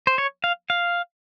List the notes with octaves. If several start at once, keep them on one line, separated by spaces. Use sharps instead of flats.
C5
C#5
F5
F5